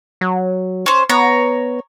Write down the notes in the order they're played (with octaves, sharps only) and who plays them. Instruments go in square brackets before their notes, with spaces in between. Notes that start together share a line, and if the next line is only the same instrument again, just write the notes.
[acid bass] F#3
[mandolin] C#4 C5
[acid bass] B3 [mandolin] C#5 A#5